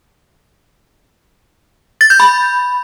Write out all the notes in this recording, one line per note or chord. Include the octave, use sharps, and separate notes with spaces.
A6
G6
B5